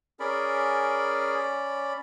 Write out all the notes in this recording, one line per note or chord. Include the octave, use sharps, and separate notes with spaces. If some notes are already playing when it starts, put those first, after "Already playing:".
C#4 G#4 A#4 D5 B5